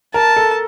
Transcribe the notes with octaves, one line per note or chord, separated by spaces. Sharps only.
A#4 A5
A4